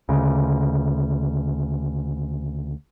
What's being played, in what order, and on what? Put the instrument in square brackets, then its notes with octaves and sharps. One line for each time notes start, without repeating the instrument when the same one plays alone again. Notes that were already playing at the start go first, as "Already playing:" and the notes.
[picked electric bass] D2 C#3